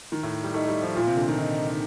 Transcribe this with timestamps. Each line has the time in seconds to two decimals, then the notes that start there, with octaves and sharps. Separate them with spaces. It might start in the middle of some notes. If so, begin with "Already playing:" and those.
0.12 D#3
0.23 A2
0.43 G3
0.54 A3 D#4
0.68 G3
0.82 F3
0.96 A#2 F4
1.07 C3
1.17 D3
1.28 D#3
1.38 D#4